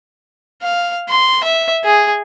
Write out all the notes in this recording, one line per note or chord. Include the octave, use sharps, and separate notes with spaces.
F5
C6
E5
G#4